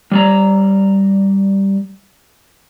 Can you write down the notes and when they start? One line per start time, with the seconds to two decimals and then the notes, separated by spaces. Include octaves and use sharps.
0.11 G3 D5 A#5